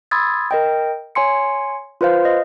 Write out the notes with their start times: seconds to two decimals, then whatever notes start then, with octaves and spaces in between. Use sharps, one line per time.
0.11 B5 C6 D#6 E6 G#6 A6
0.51 A#4 D#5 G5
1.15 C#5 G#5 C6 C#7
2.01 F4 B4 C5 F5
2.25 D#5